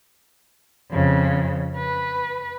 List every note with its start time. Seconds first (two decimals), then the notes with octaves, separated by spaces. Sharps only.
0.91 F2 C#3
1.78 B4